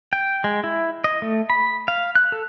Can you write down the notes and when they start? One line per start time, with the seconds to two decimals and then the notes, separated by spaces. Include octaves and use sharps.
0.13 G5
0.44 G#3
0.64 E4
1.04 D#5
1.22 A3
1.50 B5
1.88 F5
2.15 F#6
2.32 A4